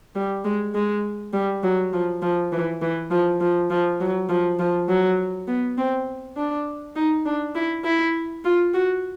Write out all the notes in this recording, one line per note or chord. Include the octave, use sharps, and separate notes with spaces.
G3
G#3
G#3
G3
F#3
F3
F3
E3
E3
F3
F3
F3
F#3
F3
F3
F#3
B3
C4
D4
D#4
D4
E4
E4
F4
F#4